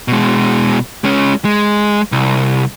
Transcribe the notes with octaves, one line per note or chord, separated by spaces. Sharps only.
B2 G#3
G#3 C#4
G#3
C2